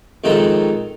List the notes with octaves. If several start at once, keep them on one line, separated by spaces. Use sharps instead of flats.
F2 D#3 G#3 A4 A#5